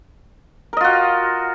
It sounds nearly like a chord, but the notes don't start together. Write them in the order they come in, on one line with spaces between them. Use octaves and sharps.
A#4 D#5 F4 F#4